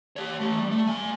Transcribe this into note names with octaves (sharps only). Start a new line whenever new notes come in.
G4 C#5
E3 A3
G3
A3
A#3 G#5